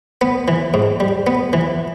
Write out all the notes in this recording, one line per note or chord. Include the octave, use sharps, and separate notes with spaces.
B3
E3
G#2
G3
B3
E3